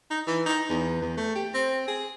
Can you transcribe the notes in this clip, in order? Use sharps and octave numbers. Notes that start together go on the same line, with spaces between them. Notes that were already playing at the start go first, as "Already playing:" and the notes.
D#4
E3
D#4
E2
E2
A3
G4
C4
G#4